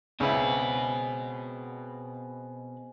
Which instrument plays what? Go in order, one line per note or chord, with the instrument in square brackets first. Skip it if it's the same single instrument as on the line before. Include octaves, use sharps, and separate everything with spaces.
[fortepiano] C#2 E4 [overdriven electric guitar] B2 B4 [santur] G#3 C4 G#4